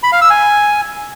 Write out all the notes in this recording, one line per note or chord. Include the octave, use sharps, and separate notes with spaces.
B5
F5
E6
G#5